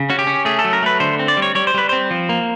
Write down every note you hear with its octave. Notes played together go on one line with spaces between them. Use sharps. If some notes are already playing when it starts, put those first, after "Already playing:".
Already playing: C#3
C#4 F#4
G4
C#4
A3 G#4
A4
F#3
A#4
A3 B4
D3 C5
C4
D5
G3
C#5
G3 C#5
C5
G3 B4
C4 C5
F3
A#3